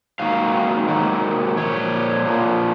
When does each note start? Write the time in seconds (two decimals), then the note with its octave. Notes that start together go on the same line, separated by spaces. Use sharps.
0.19 G#2 D#3 F#3 A#3 F5
0.88 G#2 D#3 F#3 A#3
1.57 A#2 F3 A#3 C#5
2.25 A#2 F3 A#3